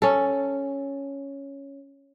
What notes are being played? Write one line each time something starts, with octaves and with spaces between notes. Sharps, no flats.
C#4 A4